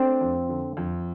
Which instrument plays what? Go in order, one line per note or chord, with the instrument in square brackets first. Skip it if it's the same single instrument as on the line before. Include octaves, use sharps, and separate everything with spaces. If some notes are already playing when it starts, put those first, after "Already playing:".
Already playing: [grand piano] A3 D4 [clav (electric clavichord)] C4
[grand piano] F2
D3
F2